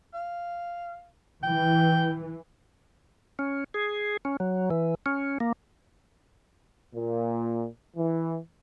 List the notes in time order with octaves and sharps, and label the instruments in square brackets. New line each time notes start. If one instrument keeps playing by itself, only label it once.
[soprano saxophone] F5
[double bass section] E3 [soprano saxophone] G5
[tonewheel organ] C#4
G#4
C#4
F#3
E3
C#4
A#3
[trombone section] A#2
E3